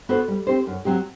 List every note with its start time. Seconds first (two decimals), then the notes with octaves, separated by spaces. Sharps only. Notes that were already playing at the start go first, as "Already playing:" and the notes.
0.09 B3 F#4 A4 C5
0.28 G3
0.47 C4 G4 C5
0.66 F#2
0.85 F#3 C4 G4